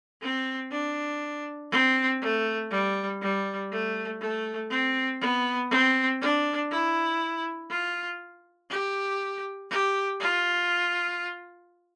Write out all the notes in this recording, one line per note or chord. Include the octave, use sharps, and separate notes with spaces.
C4
D4
C4
A3
G3
G3
A3
A3
C4
B3
C4
D4
E4
F4
G4
G4
F4